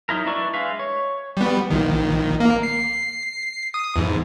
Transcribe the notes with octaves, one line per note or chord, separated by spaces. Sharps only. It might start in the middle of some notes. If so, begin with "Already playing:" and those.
F#3 D#4 E4 A#4
D4 E4 B4 D5 C#6
G#3 B4 E5 F5
C#5
G3 B3
A#1 D#3
A#3
C7
D#6
E2 G#2